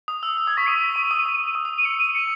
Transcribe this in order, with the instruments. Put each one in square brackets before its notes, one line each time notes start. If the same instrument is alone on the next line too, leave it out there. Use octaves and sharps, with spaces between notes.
[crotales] D#6
E6
E6
[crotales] D#6 [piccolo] G#6
[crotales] C#6 [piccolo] B6
[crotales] D#6 [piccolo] D#7
[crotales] C#6
D#6
D#6
D#6
D#6
D#6
[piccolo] D#7
[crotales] E6 [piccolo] C#7
[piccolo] D#7
C#7